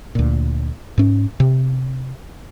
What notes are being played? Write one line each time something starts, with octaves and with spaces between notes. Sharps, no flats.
D2 A#2
G#2 C#4
C3